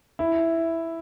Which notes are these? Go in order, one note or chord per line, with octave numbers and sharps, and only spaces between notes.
E4